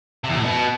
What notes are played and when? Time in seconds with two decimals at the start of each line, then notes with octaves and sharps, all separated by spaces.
0.24 C3
0.29 E2
0.35 A#2
0.40 A2
0.45 B2